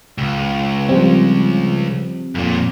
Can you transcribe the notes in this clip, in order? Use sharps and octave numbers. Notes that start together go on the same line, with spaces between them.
C#2
F3 G3 C4
F2 A#2